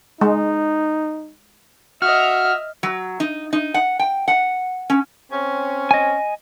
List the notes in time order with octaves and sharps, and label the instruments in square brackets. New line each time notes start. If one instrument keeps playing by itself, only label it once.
[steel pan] G#3 [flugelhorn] D#4
[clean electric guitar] F#4 [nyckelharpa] D#5 E5 [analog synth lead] F6
[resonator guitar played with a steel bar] F#3
D#4
D#4
F#5
G5
F#5
C#4
[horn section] C4 C#4
[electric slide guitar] D#5 G#5